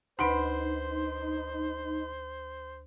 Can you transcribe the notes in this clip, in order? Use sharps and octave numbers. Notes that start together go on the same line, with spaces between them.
D2 D#4 B4 C5 B5 C6 D7